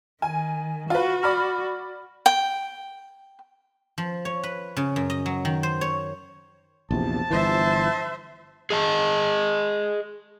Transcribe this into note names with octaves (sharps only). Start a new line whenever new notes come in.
D#3 G#5
F4 F#4 B4
D5 B5 F6
G5
F3
C#5
B4
C#3
F#2
D#5
F#3
D#3
C5
C#5
A#1 E2 C3 F3 A5
G1 E3 C5 E5
G#4 D#5 A5